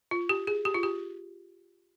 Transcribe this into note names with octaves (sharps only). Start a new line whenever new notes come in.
F4
G4
G#4
G4
F4
G4